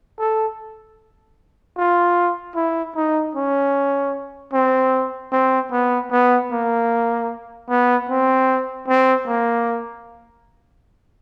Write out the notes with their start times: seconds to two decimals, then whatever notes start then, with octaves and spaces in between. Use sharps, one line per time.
0.19 A4
1.77 F4
2.56 E4
2.96 D#4
3.35 C#4
4.53 C4
5.32 C4
5.72 B3
6.11 B3
6.51 A#3
7.69 B3
8.09 C4
8.88 C4
9.27 A#3